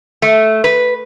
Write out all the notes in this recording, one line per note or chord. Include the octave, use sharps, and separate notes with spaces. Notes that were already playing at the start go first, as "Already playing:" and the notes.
A3
B4